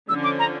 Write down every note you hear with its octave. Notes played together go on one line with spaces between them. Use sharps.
D3 F3 C#4 E6
D6
A#5